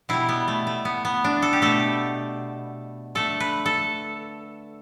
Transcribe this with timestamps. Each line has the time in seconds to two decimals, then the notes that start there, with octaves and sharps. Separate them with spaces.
0.09 B2 G3 E4
0.29 B3
0.48 A3
0.67 A3
0.85 B3
1.05 B3
1.24 D4
1.42 A4
1.53 G4
1.62 B2 A3 A4
3.15 D3 A3 A4
3.40 B4
3.66 A4